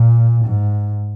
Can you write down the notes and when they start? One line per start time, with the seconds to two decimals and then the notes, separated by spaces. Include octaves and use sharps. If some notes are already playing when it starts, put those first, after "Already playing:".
Already playing: A#2
0.46 G#2